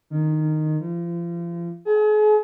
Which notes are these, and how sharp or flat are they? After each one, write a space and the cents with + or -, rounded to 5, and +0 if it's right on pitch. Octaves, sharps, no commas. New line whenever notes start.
D#3 -10
F3 -35
G#4 +40